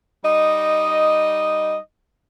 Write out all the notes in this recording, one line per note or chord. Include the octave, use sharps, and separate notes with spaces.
G3 D#4 D#5